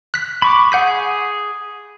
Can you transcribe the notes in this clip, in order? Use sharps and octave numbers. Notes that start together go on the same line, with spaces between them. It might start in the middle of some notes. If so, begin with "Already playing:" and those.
F#6 B6
B5 C#6 D6
G#4 F#5 G6 B6